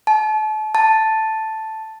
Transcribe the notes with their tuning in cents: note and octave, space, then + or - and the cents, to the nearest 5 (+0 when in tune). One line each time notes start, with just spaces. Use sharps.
A5 -35
A5 +0